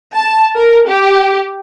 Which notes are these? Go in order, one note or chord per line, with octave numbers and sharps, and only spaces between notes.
A5
A#4
G4